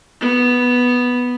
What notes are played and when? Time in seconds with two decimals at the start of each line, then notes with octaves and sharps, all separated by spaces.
0.21 B3